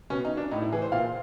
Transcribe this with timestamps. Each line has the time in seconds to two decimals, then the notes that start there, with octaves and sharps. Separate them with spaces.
0.10 B2 C#4
0.25 D#4
0.37 D4
0.51 A2 D#4
0.62 E4
0.72 E3 G#4
0.82 C5
0.92 A#2 F5